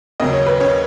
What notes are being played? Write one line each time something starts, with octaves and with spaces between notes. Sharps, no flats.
D#2 C#3 F#3 D#5
C#5
B4
C#4 C#5